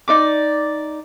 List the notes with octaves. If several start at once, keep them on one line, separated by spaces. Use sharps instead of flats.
D#4 D5 D6